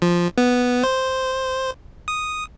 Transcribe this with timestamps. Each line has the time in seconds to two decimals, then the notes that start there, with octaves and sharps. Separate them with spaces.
0.02 F3
0.38 B3
0.84 C5
2.08 D#6